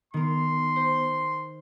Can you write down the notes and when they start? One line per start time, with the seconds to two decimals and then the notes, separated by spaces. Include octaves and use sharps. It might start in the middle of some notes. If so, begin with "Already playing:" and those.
0.14 D#3 B3 A#4 C6
0.76 C5